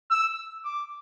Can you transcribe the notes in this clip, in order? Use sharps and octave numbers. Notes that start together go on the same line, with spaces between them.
E6
D6